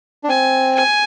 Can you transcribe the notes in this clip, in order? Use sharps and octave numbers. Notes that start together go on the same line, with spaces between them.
D4
C4 G#5
G#5